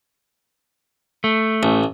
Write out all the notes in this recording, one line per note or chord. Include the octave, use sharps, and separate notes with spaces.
A3
A1